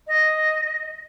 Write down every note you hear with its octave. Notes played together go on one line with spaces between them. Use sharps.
D#5